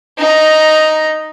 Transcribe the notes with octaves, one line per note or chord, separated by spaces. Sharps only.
D#4 A#5